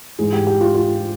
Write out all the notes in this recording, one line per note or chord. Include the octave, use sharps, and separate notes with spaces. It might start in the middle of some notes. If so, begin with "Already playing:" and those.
G#2 E3 G#4
G4
G4
F4
F4